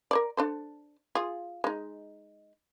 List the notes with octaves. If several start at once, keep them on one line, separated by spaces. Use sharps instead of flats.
A#4 C#5 D5
D4 A4 C5
F4 G#4
G#3 D#4